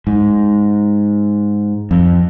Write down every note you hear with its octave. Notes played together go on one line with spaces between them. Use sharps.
G#2
F2